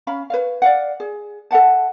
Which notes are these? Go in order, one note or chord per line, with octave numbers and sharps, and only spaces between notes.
C#4 F5 B5
B4 C#5 F5
D5 F5 F#5
G#4
A4 E5 F#5 A5